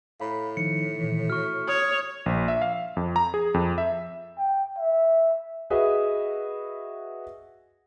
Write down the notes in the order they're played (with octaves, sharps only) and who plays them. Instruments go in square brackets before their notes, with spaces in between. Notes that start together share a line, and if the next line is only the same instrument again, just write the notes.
[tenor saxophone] A2 [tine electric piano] F5 A#5 B5
[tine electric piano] D#3 F3 D#4 [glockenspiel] C#7
[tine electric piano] A#2 D#3 E3
[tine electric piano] F#4 [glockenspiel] C#6 F6
[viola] C#5 [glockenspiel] D#6
[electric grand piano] A#1
E5
F5
F2
A#5
G#4
F2
E5
[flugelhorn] G5
E5
[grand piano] F#4 G#4 B4 D#5 E5